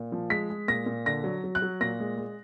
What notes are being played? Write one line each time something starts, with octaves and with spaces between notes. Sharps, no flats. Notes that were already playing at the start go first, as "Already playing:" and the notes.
Already playing: A#2
F3
G#3 B6
G#3
A#2 A#6
A#2
D3 A#6
F#3
F#3
F#6
F#3
A#2 A#6
G#3
G#3